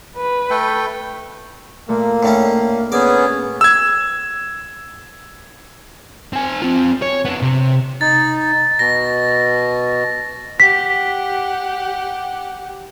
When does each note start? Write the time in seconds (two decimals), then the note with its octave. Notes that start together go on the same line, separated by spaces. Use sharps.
0.17 B4
0.50 A3 A4 G5
1.89 A#2 A3 A#3 E5
2.23 A2 A3 C#4 D4 C#6
2.92 B3 C#4 G#4 D5
3.61 E6 G#6
6.33 C4 G#5
6.62 C4 F4
7.02 C#5
7.25 B3 D4
7.42 C3
8.01 D#4 A6
8.79 B2 A#6
10.60 G4 F#5 B6